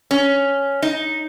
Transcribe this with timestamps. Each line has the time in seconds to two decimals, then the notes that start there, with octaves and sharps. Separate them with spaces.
0.11 C#4
0.82 D#4